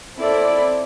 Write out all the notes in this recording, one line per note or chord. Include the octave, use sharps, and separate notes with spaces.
C4 E4 A4 D5